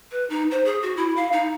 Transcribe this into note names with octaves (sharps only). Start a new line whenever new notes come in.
B4
D#4
C5
G#4
F#4
E4
F5
D#4